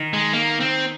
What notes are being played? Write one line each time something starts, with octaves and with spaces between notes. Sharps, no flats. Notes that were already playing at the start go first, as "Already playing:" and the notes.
Already playing: D#3
G#3
A#3
C4